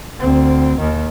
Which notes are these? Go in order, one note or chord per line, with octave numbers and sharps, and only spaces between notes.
D2 C4
D#2 D#3